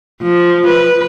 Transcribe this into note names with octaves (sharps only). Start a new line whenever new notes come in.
F3
B4